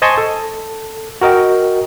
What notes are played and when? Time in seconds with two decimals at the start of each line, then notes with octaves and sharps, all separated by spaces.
0.02 C5 D#5 G#5 A5 C6 C#6
0.18 A4
1.21 F#4 A#4 D#5 G5